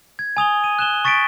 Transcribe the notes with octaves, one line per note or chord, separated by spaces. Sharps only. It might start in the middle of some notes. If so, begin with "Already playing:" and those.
G#6
G#5 D#6 F7 G7
D#7
F#6 E7 G7
C#6 A6 B6 C#7 D7